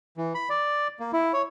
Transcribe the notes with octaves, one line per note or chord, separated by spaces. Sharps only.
E3
B5
D5
A#3
E4
C#5